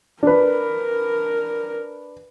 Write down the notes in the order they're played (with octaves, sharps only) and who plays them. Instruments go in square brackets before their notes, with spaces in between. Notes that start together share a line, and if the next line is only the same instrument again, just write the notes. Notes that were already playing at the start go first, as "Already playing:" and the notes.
[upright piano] D4 B4 [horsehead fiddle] A#4